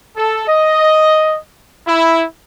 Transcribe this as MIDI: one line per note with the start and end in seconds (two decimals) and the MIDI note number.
0.16 0.44 69
0.48 1.36 75
1.87 2.24 64